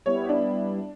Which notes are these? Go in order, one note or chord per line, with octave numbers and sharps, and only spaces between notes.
G3 B3 E4 C#5
D4